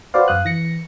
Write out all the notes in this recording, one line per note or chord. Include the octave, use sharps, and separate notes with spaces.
F#4 B4 C5 D5 F5
F#2 F5 D#6 F#6
E3 A#6 C#7